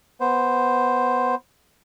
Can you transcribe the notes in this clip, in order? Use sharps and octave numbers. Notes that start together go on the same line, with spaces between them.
B3 C5